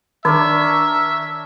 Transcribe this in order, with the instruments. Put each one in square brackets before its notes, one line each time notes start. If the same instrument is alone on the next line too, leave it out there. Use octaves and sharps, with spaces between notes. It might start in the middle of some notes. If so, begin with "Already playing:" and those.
[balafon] D#3 [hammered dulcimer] D4 A#4 C#5 [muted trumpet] E5